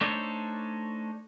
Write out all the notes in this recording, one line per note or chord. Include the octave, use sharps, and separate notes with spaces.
A3 D4 D#4 A4 C5 C#5